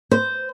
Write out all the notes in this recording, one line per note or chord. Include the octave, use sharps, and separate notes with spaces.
C5